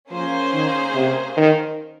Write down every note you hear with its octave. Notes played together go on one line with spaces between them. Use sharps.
F3 A#3 C#4 G#4 C5
D#3
C3
D#3